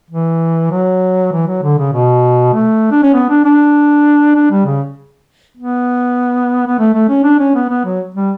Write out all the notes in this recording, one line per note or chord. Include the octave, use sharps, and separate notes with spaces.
E3
F#3
E3
F#3
D3
C#3
B2
A3
D4
C#4
B3
D4
D4
D4
G3
C#3
B3
B3
A3
A3
C#4
D4
C#4
B3
B3
F#3
G3